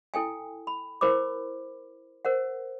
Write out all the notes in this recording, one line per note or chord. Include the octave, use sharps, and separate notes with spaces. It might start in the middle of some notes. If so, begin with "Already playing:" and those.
E4 A4 G5 G#5
B5
E4 A#4 C5 B5 D6
A#4 C5 F#5